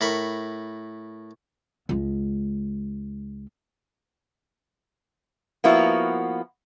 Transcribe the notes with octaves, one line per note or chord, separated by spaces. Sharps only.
A2 A#4 B5 C#6
C#2 G#3
F3 A#3 B3 E4 F#4